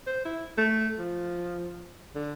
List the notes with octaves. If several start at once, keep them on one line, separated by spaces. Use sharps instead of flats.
C5
E4
A3
F3
D3